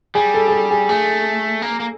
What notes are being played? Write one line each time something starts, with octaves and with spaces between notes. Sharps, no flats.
G3 G#4
A4
G#4
A4
G#4
A3 G#4
A#3
A#3